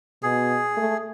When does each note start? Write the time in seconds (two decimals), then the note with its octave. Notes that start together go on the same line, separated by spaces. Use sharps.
0.23 B2 G#4
0.77 A3